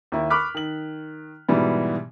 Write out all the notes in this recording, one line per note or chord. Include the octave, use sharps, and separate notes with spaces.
D#2 E4
B5 C#6 D6 F6 F#6 B6
D#3 F#7
G#2 B2 E3 G3 B3